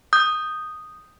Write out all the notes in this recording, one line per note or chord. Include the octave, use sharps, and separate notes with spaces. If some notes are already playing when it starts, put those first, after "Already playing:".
D#6 G6